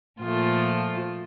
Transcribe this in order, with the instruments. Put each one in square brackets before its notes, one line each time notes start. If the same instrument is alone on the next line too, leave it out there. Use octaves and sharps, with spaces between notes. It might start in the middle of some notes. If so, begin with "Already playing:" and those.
[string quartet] A#2 F3 A3 F4